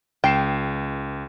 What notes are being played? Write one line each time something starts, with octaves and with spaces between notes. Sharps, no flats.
C#2 G5 C7 E7